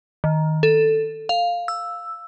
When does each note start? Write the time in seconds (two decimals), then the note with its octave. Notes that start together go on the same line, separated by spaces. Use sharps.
0.24 D#3
0.63 A4
1.29 F5
1.68 E6